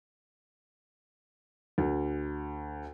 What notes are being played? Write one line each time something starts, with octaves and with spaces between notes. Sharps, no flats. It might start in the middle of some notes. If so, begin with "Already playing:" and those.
D2